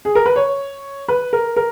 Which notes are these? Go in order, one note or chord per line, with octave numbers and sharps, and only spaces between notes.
G#4
A#4
B4
C#5
B4
A#4
A#4